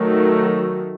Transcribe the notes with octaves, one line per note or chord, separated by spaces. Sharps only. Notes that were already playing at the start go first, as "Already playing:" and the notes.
Already playing: D#3 F#3 A3